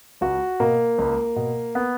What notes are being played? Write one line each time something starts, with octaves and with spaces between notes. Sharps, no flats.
C#2 F#4
B2 A#3
C#2
B2
B3